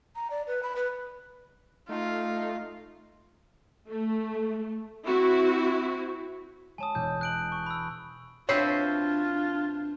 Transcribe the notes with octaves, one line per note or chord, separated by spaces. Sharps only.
A#5
D5
B4
B5
B4
A3 D#4 F4
A3
C4 E4 F#4
G#3 C#5 G#5 A5 D#6 D#7
E1 D6 E6 G6
F#6 D7 F#7
A#6
C#6
B5 E6
B2 C4 D4 E4 F4 C#5 C7